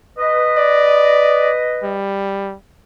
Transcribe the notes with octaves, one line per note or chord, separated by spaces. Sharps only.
B4 D#5
D5
G3